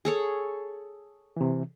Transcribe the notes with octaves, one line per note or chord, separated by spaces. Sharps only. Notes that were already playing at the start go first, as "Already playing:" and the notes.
G#4 A4 C#5
C3 E3